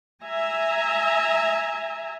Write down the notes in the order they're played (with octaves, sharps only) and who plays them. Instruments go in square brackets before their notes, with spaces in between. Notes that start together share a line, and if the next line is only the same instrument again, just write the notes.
[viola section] E5 G#5 A#5